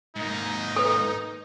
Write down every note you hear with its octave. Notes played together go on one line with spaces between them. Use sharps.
G#2 A#3 D#4
A4 B4